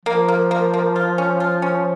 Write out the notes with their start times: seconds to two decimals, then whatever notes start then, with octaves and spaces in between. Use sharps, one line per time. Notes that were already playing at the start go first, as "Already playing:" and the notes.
0.06 F3 A#3
0.28 A#3
0.51 A#3
0.74 A#3
0.96 F4
1.18 C#4
1.40 F4
1.62 C#4